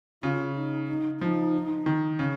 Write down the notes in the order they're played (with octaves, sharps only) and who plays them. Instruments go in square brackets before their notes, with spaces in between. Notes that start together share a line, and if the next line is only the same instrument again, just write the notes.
[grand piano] C#3 [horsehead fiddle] F4
[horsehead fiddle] D#4
D#4
[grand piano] F3 [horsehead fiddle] D#4
[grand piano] D#3
C#3